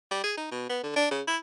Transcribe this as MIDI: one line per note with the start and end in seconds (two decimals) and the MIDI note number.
0.11 0.22 55
0.23 0.33 68
0.37 0.48 63
0.51 0.69 47
0.69 0.81 59
0.83 0.94 50
0.96 1.08 62
1.11 1.21 49
1.27 1.37 64